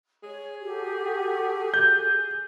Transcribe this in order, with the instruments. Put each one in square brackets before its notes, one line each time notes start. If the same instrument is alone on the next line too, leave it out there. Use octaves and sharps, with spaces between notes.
[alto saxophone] G#4 [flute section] C#5
[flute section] F#4 G4 A4
[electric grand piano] G6